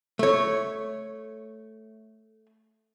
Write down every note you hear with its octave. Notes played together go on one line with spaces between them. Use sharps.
A3 C#5